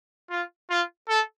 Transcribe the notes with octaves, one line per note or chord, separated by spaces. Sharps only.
F4
F4
A4